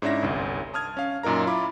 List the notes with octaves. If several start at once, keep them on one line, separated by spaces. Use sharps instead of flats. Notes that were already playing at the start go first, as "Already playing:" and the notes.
G#2 C#4 D4 E4 E5 A#6
G1 C2
A5 D#6 F6 G#6
C#4 F5
F#2 A#2 D#4 A#4 A#5
E4 F4 B5 D6